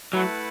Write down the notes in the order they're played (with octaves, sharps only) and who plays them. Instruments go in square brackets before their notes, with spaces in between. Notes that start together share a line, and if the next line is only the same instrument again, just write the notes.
[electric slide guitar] F#3 [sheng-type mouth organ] A3 E4 B4 F#5 A5